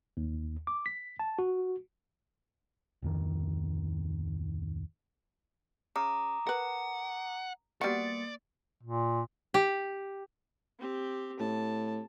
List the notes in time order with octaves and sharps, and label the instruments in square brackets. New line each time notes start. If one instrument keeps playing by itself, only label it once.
[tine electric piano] D#2
D6
B6
A5
F#4
[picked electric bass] D1 F2 D#3
[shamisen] C#3 [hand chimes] A#5 D6 D#6
[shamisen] A#4 B4 [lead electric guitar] F#5
[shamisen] G3 B3 F#4 [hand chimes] A#3 A6 C#7 [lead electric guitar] D5
[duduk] A#2
[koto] G4
[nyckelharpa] C4 G4
[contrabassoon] A2 [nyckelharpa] A5